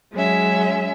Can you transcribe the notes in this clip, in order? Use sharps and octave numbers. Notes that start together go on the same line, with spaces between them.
F#3 G#3 C#4 E5